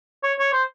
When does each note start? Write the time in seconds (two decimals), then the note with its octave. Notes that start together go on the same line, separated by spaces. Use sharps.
0.23 C#5
0.39 C#5
0.53 C5